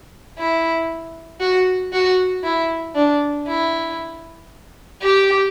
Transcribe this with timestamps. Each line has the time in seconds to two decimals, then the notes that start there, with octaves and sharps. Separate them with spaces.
0.38 E4
1.40 F#4
1.93 F#4
2.44 E4
2.95 D4
3.47 E4
5.02 G4